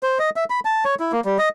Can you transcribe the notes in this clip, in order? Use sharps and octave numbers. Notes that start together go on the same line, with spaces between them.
C5
D#5
E5
B5
A5
C#5
E4
A#3
G3
D#5